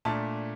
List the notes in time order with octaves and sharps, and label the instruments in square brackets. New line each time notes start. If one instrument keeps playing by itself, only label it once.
[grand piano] A#2 A3 D4 A5